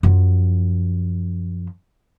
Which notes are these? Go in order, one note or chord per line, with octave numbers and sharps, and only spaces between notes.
F#2 F3